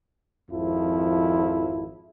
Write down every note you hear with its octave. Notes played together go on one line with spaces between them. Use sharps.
G#1 F2 F3 E4